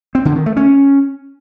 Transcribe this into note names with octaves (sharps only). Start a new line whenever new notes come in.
C4
D3
D#3
A3
C#4